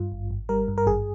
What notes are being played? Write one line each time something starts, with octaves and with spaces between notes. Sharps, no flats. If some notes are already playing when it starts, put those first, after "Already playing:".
Already playing: G2 F4
G#1
G#1
G3 A#4
G2
A#4
G#1 G#4